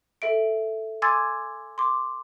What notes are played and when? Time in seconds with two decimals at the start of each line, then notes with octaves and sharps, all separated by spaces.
0.22 A4 E5 D7
1.02 G#5 C6 D6 E6 G#6 A6
1.78 C6 D6